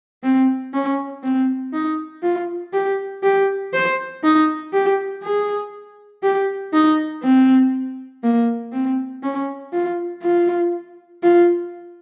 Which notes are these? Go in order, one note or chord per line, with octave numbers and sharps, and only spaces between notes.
C4
C#4
C4
D#4
F4
G4
G4
C5
D#4
G4
G#4
G4
D#4
C4
A#3
C4
C#4
F4
F4
F4